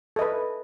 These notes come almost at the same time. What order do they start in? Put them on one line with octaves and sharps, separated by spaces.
A4 D#5 B4